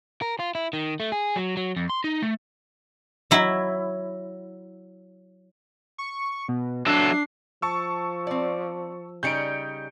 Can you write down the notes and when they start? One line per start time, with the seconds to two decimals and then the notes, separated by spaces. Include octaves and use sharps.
0.22 A#4
0.39 F4
0.55 E4
0.73 D#3
1.00 A3
1.12 G#4
1.36 F#3
1.57 F#3
1.77 F2
1.90 C6
2.04 D#4
2.22 A3
3.31 F#3 E4
5.98 C#6
6.48 B2
6.86 F#3 D4 A4 E5 C7
7.62 F3 A5 C#6 E6
8.27 C4 D5
9.23 C#3 G3 D#4 G6 C#7 D7